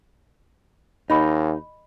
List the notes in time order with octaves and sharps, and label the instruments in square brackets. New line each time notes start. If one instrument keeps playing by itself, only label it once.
[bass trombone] D#2 [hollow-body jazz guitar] D#4 [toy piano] D#5 B5 C#6